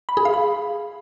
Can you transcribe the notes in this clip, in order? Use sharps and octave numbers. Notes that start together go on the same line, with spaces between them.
B5
G#4
F5
B5